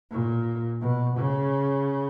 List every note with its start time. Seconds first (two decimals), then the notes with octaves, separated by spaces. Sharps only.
0.11 A#2
0.81 B2
1.16 C#3